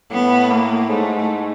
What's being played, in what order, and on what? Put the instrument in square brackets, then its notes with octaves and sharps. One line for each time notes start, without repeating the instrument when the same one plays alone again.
[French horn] A2 [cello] B3
[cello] A#3
[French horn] G#2 [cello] A3